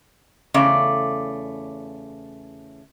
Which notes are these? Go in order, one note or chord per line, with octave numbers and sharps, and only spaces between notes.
E2 C#3 A3 D5